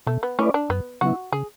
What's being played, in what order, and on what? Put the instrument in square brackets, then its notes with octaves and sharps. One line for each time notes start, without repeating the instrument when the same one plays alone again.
[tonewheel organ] B2 [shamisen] A3
[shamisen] B3
[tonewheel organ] A3 E4 B4 D5 [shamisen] C#4
[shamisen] D4
[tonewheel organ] F#2 [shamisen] B3
[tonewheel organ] C#3 F#3 B3 E4 [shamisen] F#4
[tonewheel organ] C#3 [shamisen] G#4